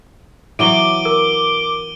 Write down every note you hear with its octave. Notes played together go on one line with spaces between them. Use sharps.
E3 F#3 B3 D6 D7 D#7 G7
A#4